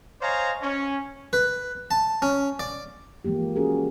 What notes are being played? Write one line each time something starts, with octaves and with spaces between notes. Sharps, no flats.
C5 C#5 D#5 F5 G#5 A#5
C#4
B4
A5
C#4
D5
E3 F3 G#3 A#3 G4
C#4 F#4 G#4 A#4